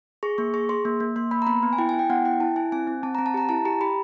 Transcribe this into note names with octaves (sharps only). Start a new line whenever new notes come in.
G#4 C#6
A#3 C#6
G#4 C#6
G#4 C6
A#3
A#3
A#3 C6
A#3 B5
A#5
B3 B5
B3
G#5
E4 G5
E4 G#5
G5
B3 F#5
E4 G5
E4 A5
E4 G#5
C4 G#5
C4
C4 A5
C4 A#5
A5
G4 A#5
E4 A5
G4 A#5
G4 B5